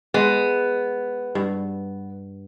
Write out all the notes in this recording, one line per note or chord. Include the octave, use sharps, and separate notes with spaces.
G#3 B3
G2